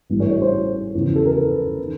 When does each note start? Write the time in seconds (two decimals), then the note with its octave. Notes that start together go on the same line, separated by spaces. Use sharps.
0.10 A1 G2 E3
0.20 C#5
0.30 C#5
0.42 C5
0.94 E2 C#3 F3
1.16 A4
1.26 A#4
1.36 B4
1.78 D#3